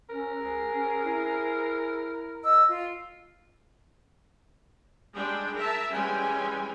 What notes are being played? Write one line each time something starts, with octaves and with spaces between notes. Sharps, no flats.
C#4 A#4
C#2 G#4
C#4
E4
D#5 E6
F4
G3 G#3 D4 G#4 G5
A#4 E5 A5
E3 G3 G#3 C#4 G5 G#5